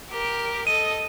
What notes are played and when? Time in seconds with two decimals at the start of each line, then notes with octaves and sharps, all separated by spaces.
0.11 G4 A#4
0.67 A4 D#5 D#7